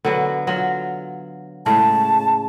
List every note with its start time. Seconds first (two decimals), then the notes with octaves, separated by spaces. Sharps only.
0.05 D3 F#3 B3
0.47 F#3 F4
1.66 A2 C#3 G#3 A5